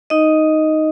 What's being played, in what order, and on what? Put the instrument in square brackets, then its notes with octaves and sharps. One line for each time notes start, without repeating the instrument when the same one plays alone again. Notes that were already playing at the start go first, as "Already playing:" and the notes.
[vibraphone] D#4 D#5